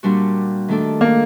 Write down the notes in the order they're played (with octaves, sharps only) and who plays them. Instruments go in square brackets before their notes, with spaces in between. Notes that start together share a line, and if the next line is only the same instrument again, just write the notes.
[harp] A#2 G3 D4 F#4
D#3 A3 D4 A4 D5
[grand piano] A#3